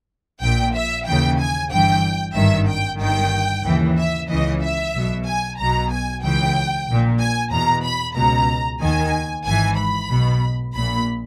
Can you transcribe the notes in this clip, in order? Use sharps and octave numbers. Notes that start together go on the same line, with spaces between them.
A#1 A#2 G5
E5
D#2 C#3 E3 G5
G#5
G1 G2 E3 G5
G#1 G2 D#3 E5
G5
G1 G2 D#3 G5
D#2 C#3 E3
E5
C#2 C#3 E3 D#5
E5
B1 B2
G#5
B1 B2 A#5
G#5
C#2 C#3 E3 G5
A#1 A#2
G#5
E2 B2 A#5
B5
C#2 B2 A#5
D#2 D#3 G#5
G#1 G#2 E3 G#5
B5
B1 B2
A#1 A#2 B5